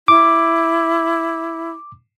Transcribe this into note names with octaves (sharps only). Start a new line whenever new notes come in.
E4 D6